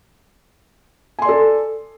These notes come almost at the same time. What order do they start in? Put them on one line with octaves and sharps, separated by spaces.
G#5 C6 D5 A4